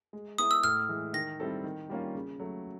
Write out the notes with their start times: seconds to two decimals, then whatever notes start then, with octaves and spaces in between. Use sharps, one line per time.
0.13 G#3
0.38 B3 E4 G#4 D#6
0.51 E6
0.64 A2 F6
0.89 E3 G#3
1.13 D#3 A#6
1.40 G3 C4 E4 A4
1.64 D#3
1.90 G3 A#3 C#4 F4
2.15 C#3
2.40 F#3 A3